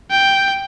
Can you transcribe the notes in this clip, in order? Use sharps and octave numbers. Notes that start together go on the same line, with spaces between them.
G5